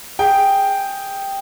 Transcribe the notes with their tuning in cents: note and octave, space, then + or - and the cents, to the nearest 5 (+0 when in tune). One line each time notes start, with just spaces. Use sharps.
G#4 +0 G5 +0